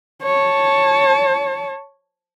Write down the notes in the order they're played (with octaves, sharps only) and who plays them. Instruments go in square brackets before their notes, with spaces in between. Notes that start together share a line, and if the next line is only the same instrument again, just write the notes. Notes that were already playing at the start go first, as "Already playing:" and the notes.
[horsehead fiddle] C#5 A5